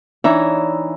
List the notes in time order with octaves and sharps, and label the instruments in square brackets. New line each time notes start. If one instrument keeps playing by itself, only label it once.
[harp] E3 D4 D#4 C#5 E5 A#5